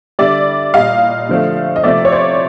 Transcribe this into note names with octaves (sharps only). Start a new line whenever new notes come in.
D3 G3 D5 E5
A#2 G3 D#5 F5
D3 F3 A3
D#5
C3 F3 A3 D5 E5
C#5
C5 D5